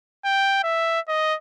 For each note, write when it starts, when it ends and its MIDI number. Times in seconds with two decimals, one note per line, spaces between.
0.25 0.59 79
0.64 1.00 76
1.08 1.35 75